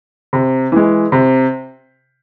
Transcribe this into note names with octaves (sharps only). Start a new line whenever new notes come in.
C3
E3 G#3
C3